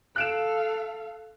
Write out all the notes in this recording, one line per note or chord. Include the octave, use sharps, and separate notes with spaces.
A4 F5 F#6 D7 E7